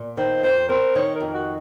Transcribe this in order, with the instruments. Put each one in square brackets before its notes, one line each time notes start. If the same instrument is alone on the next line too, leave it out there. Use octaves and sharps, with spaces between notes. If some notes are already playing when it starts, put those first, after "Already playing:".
Already playing: [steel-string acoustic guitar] A#2
[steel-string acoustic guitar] D#3 [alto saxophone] C5
[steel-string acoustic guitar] F2 [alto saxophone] C5
[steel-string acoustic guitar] C4 [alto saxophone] A#4
[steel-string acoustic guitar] D#3 [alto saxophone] C#5
[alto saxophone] A#4
[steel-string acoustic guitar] F2
[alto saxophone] F#4